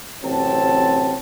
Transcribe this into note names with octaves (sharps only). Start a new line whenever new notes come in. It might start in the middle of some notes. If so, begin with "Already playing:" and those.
A1 C3 F#3 C4 A5